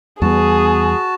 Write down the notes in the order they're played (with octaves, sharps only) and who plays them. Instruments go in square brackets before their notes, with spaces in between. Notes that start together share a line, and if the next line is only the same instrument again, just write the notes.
[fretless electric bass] E2 G3 B3 [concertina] F#4 A5 [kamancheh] G#4